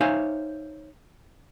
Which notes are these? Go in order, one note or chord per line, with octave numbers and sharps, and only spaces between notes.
D#4 C5 C#5 E5 F5 G#5